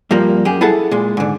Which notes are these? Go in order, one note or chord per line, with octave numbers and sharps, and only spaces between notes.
G2 F3 G3 A#3
F#2 G4 G#4
E4 G#4 A4 F#5 A5
A#2 G#3
G#2 D3